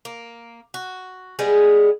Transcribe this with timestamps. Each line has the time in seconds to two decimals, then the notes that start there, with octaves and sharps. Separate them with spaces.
0.05 A#3
0.74 F#4
1.39 G3 G#3 B3 G#4